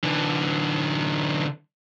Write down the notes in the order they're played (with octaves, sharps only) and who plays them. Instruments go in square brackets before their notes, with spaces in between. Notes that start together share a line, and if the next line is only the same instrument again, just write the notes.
[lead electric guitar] D3 E3